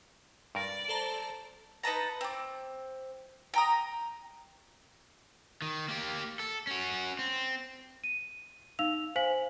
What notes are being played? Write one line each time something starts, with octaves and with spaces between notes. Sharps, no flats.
G2 A#4 D5
A4 C5 A5 A#5
D#4 B4 A5 A#5
C4 D6
G5 A#5 D#6
D#3
A#3 G4
A4
C#4 F#4
C4
D#7
D#4 F5 E6 F7
C5 F5 G#5 B6 F#7